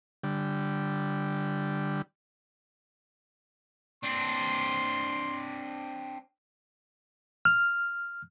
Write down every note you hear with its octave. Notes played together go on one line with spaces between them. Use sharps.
D3 G3
C4 D4 C6
F6